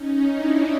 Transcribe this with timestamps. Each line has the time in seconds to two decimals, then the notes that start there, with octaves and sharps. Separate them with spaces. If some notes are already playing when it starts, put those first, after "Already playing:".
Already playing: C#4 D#4
0.30 D4 E4